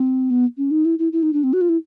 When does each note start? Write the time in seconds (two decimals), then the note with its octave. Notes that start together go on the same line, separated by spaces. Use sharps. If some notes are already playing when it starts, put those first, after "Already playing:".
Already playing: C4
0.30 B3
0.58 C#4
0.71 D#4
0.85 E4
0.99 E4
1.13 E4
1.23 D#4
1.33 D4
1.43 C4
1.53 F#4
1.61 F4
1.69 E4